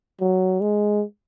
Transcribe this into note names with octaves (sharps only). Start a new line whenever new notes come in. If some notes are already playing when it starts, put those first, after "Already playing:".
F#3
G#3